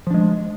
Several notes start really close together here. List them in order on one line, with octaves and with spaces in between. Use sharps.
F3 D4 G#3